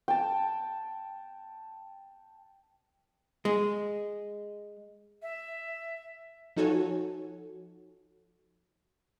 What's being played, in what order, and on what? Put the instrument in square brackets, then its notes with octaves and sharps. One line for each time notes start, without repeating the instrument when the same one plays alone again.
[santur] G5 A5
[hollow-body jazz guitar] G#3
[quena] E5
[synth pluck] F3 D#4 F#4 A4 C#5 G#5